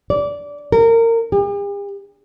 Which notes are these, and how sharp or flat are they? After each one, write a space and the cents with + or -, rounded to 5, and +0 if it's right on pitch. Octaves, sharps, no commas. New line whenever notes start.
D5 -20
A#4 -25
G4 +45